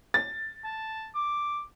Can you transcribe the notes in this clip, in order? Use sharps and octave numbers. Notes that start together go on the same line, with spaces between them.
A6
A5
D6